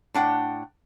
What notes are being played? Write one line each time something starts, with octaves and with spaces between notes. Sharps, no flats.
A2 D4 F#5 G5